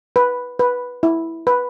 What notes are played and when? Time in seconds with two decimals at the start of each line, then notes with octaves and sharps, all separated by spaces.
0.16 B4
0.59 B4
1.03 E4
1.47 B4